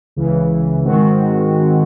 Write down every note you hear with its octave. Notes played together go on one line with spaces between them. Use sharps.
C#2 C#3 E3
G#2 D#3 G#3 C4 F#4